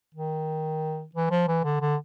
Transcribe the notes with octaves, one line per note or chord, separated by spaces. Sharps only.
D#3
E3
F3
E3
D3
D3